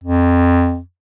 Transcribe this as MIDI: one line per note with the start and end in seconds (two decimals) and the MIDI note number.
0.04 0.79 41